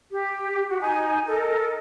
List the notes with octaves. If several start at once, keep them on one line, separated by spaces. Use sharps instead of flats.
G4
F#4
D#4 G#5
A4 A#4 D#5